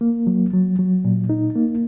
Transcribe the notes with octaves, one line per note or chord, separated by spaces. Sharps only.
A#3
F#3
F#3
F#3
A#2
D#4
A#3